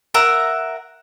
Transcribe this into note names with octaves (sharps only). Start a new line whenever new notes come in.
A#4 E5 F#5 A#5